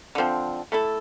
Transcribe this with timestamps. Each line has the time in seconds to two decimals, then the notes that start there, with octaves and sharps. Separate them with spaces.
0.15 D3 F3 C4
0.72 A3 E4 A4